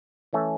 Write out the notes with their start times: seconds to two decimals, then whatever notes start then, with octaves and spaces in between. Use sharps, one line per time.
0.33 E3 A3 C#4